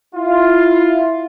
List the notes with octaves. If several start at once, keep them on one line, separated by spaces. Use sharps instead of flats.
E4 F4